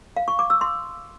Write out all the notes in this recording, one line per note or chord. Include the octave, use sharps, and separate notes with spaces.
F5
C#6
D6
E6
C6